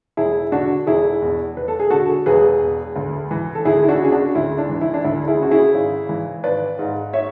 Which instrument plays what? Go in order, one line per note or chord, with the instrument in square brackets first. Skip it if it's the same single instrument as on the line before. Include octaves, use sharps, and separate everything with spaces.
[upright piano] E1 E4 G#4
D3 D4 F#4
E1 E4 G#4
E2
E1 B4
A4
G#4
D3 F#4 A4
E1 G#4 B4
E2
D2
E3
A4
D2 E4 G#4
E4
D4 F#4
C#3 G#4
D4 F#4
D2 E4
D4
E3
E4
D4
D2 E4
E4 G#4
C#3 F#4
E4 G#4
G#1
E3
G#1 B4 D5
G#2
C#5 E5